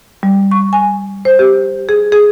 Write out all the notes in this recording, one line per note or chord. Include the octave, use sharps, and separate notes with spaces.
G3
C#6
G#5
C5
G4
G#4
G#4